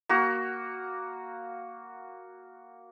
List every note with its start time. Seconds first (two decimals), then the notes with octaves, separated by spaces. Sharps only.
0.09 A#3 F#4